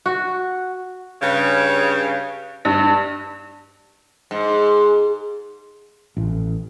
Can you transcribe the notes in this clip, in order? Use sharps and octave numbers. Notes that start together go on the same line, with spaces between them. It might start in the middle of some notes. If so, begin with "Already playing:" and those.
F#4
G2 C#3
G2
G#2
A1